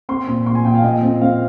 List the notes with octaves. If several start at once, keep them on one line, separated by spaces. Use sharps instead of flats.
C4 C6
A#2
A#2 C6
G#5
A#2 G5
F5
A#2 D#5
C4
C4 F5